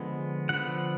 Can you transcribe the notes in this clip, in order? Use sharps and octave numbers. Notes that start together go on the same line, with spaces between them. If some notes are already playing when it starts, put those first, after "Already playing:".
Already playing: D3 F3 G#3 B3
D3 F3 B3 F#5